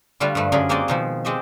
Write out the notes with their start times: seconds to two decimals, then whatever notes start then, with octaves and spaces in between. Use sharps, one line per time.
0.20 D3 G3 A3 F4 B4
0.35 G2 F3 A3 B4
0.52 F#2 D3 F4 G#4 A#4 B5
0.69 G#3 A#3 C4 F#4 D5 D#5
0.88 B2 D#3 F3
1.25 G#3 C4 G4 D#5 E5